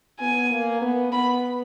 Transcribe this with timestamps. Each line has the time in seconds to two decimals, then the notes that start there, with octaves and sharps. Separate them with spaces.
0.20 B3 G#5
0.51 A#3
0.82 B3
1.12 B3 B5